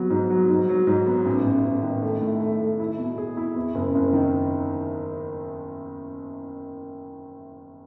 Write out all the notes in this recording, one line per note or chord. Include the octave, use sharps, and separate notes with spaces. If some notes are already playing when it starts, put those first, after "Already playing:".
Already playing: F#3 B3
G#2
F#3
G#2
F#3
G#2
B3
A1
A1
A1
D#3
A3
A2
A3
A3
E4
B2
G#4
E4
E2
F#1
F#1
D#3